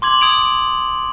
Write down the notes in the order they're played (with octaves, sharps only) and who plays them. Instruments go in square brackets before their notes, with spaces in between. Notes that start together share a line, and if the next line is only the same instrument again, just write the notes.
[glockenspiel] C6 D6 G#6 F#7
D#6 G#6 D7 F7